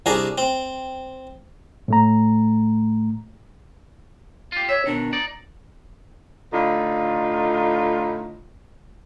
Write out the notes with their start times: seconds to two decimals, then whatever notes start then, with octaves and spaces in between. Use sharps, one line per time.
0.06 C2 D4 G#4 A#5
0.38 C4
1.88 A2 A3 A#5
4.52 F4 G4
4.69 C#5 E5
4.86 B2 D#3 D4
5.13 D#4 D5
6.52 A2 D3 D#4 F4